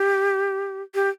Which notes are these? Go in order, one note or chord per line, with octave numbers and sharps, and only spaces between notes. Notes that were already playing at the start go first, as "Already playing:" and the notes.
Already playing: G4
G4